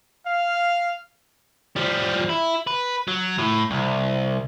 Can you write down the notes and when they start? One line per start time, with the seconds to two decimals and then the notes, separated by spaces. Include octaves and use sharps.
0.25 F5
1.76 F3 G3
2.29 E4
2.67 B4
3.08 F#3
3.38 A2
3.71 C2